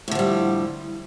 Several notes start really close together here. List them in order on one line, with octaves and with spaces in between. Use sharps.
A2 D3 F3 G3